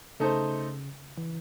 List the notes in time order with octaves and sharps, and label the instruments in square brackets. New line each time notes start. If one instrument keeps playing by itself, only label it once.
[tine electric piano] C#3 [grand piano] A3 D#4 A4 C5
[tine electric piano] E3